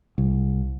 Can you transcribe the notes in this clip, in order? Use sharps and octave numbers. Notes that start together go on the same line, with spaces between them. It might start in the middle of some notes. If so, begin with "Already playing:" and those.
C2